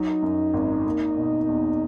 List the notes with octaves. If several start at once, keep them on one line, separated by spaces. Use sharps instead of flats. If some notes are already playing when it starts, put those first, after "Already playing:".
Already playing: F#3 D#4
F#2
G#1
A#3
B2
E2